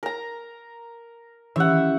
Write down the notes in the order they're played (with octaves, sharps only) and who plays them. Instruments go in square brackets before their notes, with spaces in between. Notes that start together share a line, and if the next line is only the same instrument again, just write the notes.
[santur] A#4 A#5
[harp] E3 [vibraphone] C#4 G4 [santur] E5 F#5